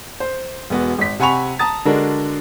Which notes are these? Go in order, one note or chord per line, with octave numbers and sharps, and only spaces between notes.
C5
E1 B3 F#4
G#1 B6
C3 F#5 G#5 B5 C#6 F7
A5 A#5 D#6 A6
D3 G#3 D4 F#4 A#4